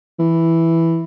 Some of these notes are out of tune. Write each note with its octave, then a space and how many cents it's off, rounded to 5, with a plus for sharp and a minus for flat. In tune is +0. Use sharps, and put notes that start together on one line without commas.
E3 +0